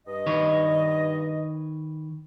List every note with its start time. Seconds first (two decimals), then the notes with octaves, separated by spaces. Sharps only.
0.07 G2 D#5
0.26 D#3 B4 C#5